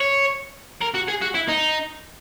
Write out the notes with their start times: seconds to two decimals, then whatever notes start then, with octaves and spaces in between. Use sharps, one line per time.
0.01 C#5
0.82 A#4
0.95 F#4
1.08 G#4
1.22 F#4
1.35 E4
1.49 D#4